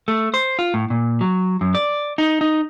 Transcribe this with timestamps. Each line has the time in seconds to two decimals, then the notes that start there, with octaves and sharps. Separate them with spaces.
0.08 A3
0.34 C5
0.59 F4
0.74 A2
0.90 A#2
1.21 F#3
1.61 F#2
1.75 D5
2.18 D#4
2.41 D#4